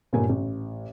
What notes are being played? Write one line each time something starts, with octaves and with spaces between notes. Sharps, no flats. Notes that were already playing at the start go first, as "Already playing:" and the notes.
G1 A#2 G3 A#3 G#5
A1